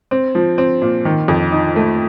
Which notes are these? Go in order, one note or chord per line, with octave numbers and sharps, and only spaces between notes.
C4
F3
C4
A#2
D#3
F2
D#4
A3